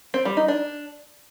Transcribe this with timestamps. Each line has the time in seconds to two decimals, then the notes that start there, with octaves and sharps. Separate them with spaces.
0.14 C4
0.25 G3
0.37 D#4
0.48 D4